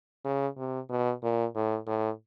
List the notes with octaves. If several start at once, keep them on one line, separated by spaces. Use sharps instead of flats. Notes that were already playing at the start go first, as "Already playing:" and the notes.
C#3
C3
B2
A#2
A2
A2